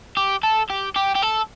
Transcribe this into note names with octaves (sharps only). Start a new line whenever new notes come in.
G4
A4
G4
G4
G4
A4